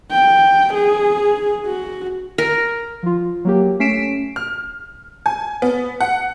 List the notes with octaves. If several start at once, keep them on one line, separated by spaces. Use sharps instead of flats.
G5
G#4
F#4
A#4
F3 F4
F#3 A#3 G4
A3 C#4 B6 C7 D7 E7
F6
G#5
B3
F#5